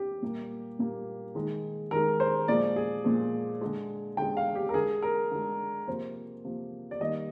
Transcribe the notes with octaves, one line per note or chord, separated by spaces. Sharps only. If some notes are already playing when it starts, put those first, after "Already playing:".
Already playing: G4
A#2 G3 A#3
A#2 G3 A#3
D#3 G#3
D#3 G#3 A#4
C5
A#2 F3 G#3 D5
G#4
A#2 F3 G#3
D3 G#3
D3 G#3 G5
F5
G4
A#4
D3 G#3 G#4
A#4
D3 G#3
C3 F3 A#3 C5
C3 F3 A#3
D5
D#3 G3 A#3 D#5